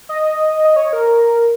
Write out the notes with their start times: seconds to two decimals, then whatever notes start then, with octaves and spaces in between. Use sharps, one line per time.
0.09 D#5
0.65 D#5
0.76 C#5
0.93 A#4